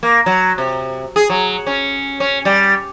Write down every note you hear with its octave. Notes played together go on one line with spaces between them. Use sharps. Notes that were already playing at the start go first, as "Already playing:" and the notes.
A#3
F#3
C3
G#4
F#3
C#4
C#4
G3